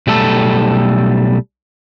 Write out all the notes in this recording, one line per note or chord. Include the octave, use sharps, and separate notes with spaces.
B1 G3 A3 A4